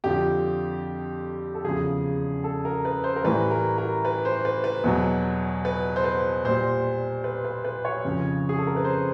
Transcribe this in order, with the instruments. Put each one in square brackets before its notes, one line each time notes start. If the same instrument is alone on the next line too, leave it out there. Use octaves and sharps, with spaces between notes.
[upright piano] F2 D3 F3 G4
A4
E2 C#3 F3 G#4
A4
A#4
B4
C5
A#4
A2 E3 G3 B4
A#4
A#4
B4
C5
B4
B4
E2 B2 F#3
B4
C5
B4
A#2 G3 C5
B4
B4
B4
C#5
F2 C#3 F3
G#4
A4
A#4
B4
C5